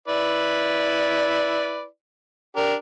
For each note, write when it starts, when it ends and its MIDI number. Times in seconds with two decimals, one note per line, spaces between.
0.08 1.85 64
0.08 1.85 71
0.08 1.85 74
2.56 2.74 62
2.56 2.74 67
2.56 2.74 70